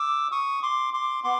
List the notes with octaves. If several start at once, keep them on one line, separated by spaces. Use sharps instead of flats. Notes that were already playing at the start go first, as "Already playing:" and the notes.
Already playing: D6 E6
C#6 D#6
C6 D6
C6 D6
B3 C6 D6